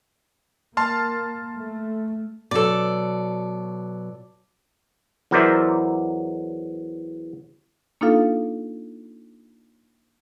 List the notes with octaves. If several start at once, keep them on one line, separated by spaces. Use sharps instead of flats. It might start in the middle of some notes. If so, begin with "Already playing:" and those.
A#3 A5 C6 F6
A3
B2 F#3 A4 D5
E2 F#3 A#4 C5 D5 E5
A#3 D4 D#4 F4 A4 F5